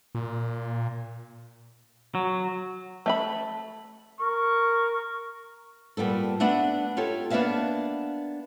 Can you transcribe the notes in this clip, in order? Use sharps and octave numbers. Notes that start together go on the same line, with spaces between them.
A#2
F#3
A3 E5 B5
A#4 C#6
A#2 G3 B3 A4
A3 B3 D4 E5 F#5
F4 G4 A4 C#5
A#3 B3 D4 E5 F5 A5